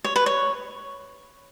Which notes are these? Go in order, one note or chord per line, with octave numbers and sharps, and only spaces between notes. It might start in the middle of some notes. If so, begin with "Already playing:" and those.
C#5
B4
C#5